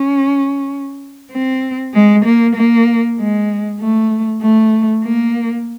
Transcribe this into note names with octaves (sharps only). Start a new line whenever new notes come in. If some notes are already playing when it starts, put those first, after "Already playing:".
Already playing: C#4
C4
G#3
A#3
A#3
G#3
A3
A3
A#3